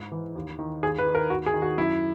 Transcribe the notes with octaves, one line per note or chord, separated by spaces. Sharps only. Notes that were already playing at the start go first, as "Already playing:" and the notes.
Already playing: G#2
E3
D#2
D#3
D#2 G#4
B4
D#3
A#4
D#2 F#4
G#4
D#3
F#4
F#2 E4